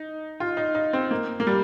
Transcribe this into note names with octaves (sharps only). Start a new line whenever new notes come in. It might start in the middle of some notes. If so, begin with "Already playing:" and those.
Already playing: D#4
F4
D#4
D#4
C4
A#3
A#3
G3